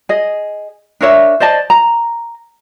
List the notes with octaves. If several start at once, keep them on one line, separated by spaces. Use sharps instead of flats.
G#4 D#5
D4 A#4 C#5 E5
C5 D5 D#5 A5
A#5